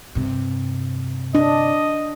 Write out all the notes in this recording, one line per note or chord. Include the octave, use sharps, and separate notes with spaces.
G2 C3
D4 D#5